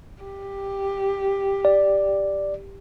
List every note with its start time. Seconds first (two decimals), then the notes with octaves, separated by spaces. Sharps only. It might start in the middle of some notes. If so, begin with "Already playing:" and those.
0.24 G4
1.65 D5